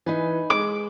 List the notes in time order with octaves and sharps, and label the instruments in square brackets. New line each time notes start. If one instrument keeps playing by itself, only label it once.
[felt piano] E3 [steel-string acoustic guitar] D#4 B4 G#5
[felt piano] G#3 [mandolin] D6